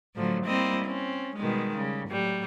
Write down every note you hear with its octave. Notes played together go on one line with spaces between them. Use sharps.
A2 D3 F3 F#3
G3 A#3 C4 E4 D#5
C4 C#4
B2 D#3 G3 G#3
C#3 G3
A2 F#3 G3